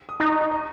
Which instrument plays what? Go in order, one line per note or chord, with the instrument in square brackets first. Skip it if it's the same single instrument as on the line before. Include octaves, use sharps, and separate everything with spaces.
[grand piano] D#6
[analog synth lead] D#4 [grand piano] D#6
[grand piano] C#6
A#5
D#5